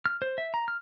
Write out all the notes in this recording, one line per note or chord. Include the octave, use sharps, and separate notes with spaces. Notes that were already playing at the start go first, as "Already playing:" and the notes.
F6
C5
E5
A#5
F6